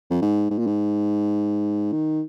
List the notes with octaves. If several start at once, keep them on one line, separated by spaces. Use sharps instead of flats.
F2
G#2
G#2
A#2
G#2
D#3